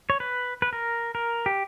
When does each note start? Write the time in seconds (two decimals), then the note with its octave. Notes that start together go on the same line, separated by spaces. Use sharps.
0.10 C#5
0.20 B4
0.62 B4
0.73 A#4
1.15 A#4
1.46 G4